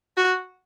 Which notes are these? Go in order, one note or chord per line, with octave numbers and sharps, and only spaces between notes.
F#4